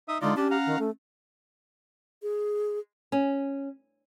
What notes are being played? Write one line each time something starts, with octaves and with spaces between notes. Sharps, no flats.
D#4 E5 D#6
D3 G#3 D#4 F4 D5
C#4 D4 G4 A5
F5 F#5 A#5
D#3
A3
G#4
C#4